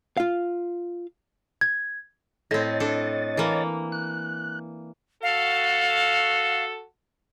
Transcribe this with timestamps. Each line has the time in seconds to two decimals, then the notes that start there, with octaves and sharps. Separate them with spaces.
0.17 F4 F5
1.61 G#6
2.51 A2 C4 C#5 D#5 A6
2.80 D4 A4
3.37 E3 A#3
3.92 F#6
5.23 F#4 A4 F5